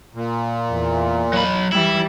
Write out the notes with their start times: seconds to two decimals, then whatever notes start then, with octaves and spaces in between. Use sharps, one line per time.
0.15 A#2
0.69 E2
1.33 F#3 B5
1.72 E3 G3 E4